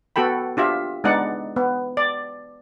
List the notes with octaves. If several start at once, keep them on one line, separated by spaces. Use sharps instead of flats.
B3 F#4 A4 G5 B5
D4 F4 G4 E5
G#3 B3 D4 D#4 D5 F#5
B3
D5